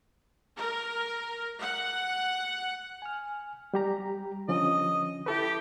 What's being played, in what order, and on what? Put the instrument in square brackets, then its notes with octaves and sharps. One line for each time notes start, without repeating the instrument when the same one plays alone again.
[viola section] A#4
F#5
[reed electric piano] G#5 F6
G3 G4 A#5
[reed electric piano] D3 F3 C#4 [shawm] D#5
[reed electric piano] E4 A4 B4 [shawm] G4